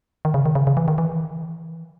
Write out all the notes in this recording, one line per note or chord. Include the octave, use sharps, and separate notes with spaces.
D#3
C#3
D#3
C#3
C#3
E3
D#3
E3